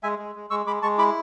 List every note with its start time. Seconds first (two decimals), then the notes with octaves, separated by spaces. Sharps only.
0.03 G#3 E5 G#5
0.19 G#3
0.35 G#3
0.50 G#3 C#6 E6
0.66 G#3 B5 D6
0.82 G#3 A5 C#6
0.98 E4 B5 D6